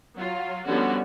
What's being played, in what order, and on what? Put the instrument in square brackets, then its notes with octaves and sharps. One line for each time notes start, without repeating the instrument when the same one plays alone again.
[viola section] F#3 F4
D3 F3 G3 B3 C#4 F#4